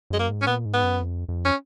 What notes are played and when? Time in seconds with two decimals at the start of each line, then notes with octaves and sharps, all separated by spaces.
0.10 F#2 G#3
0.19 A#3
0.29 G#2
0.42 C#4
0.47 A#2 B3
0.65 G#2
0.74 B3
0.83 F#2
1.01 F2
1.29 F2
1.45 C#4